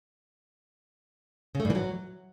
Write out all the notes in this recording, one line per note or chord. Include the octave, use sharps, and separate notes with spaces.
C#3
A3
G2
E3
F#3